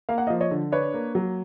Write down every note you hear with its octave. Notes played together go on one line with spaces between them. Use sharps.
A#3 F5
F#5
D#5 F5
F3
C#5 D#5
D3
D4 B4 C#5
A#3
F#3